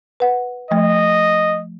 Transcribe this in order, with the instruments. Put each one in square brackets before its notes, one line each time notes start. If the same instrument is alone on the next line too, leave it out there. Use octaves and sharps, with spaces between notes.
[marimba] B4 F#5
[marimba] F3 A3 [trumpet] D#5